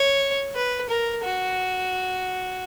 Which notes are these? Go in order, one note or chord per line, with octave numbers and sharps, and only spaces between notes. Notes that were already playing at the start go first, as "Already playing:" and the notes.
Already playing: C#5
B4
A#4
F#4